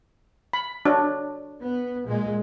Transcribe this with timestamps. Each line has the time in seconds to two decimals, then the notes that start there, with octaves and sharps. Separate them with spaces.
0.53 B5
0.85 D4 F#4 C#5
1.63 B3
2.05 A#2 G#3